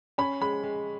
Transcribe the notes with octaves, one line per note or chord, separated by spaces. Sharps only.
C#4 B5
G#3 B5
G#3